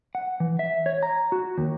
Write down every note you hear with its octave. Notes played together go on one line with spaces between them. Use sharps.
F#5
E3
E5
C#5
A#5
F#4
D#2